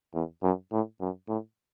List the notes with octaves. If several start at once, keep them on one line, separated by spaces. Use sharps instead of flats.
E2
F#2
A2
F#2
A2